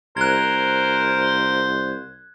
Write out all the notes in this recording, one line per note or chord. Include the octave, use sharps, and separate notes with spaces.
C2 A#4 C5 F#6 G#6